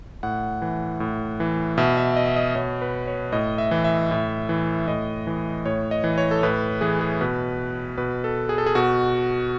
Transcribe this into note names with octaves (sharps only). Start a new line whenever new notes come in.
A2 F#5
E3
A2
E3
B2 E5
E5
E5
D#5
E5
D#5
B2 C#5
B4
C#5
A2 D#5
E5
E3
E5
A2
E3
A2 D#5
E3
A2 C#5
D#5
E3
C#5
A4
A2 B4
E3 G#4
G#4
B2 B4
B2 B4
A4
G#4
A4
G#4
B2 F#4